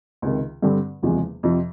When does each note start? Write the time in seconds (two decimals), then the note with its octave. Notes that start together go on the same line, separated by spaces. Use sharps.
0.22 C#2 C3 D#3
0.62 G2 D3 G3 C4
1.02 F#1 E2 C3 F3 G#3
1.43 F2 C3 F3